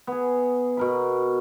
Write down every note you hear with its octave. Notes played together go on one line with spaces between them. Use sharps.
B3 G#4
B2 A#4 B5